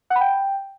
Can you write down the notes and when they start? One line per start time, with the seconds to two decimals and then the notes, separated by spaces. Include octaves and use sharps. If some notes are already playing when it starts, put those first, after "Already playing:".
0.10 F#5
0.16 B5
0.21 G5